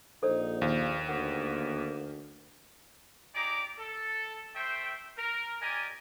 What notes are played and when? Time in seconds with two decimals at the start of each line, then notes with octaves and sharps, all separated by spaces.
0.23 A#1 D#4 A4 C5 D5
0.62 D#2 F5
1.09 D2 A#3 F#5
3.35 D#4 G4 G#4 D5 A#5 D6
3.78 A4
4.55 A3 C5 E5 G5
5.18 A#4
5.61 G4 A#4 D5 D#5 G#5